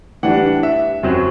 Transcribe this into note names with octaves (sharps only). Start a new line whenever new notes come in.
A2 E3 G3 D4 F#5
E5
F#2 F#3 C4